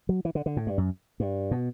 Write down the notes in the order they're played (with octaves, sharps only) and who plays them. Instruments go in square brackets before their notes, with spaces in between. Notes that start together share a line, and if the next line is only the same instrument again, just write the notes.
[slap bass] F#3
E3
D3
D3
A2
G2
F#2
G2
B2